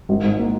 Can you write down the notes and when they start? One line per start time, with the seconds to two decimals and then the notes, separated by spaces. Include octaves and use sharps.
0.09 G#1
0.24 G#2
0.39 A#3